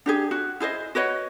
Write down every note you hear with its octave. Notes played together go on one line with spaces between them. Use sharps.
D4 G4 G#4
F#4
E4 G#4 C5 D#5
F#4 B4 C#5 D#5